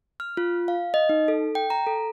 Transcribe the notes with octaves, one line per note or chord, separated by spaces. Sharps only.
F6
F4
F5
D#5
D#4
A4
G5
A#5
A4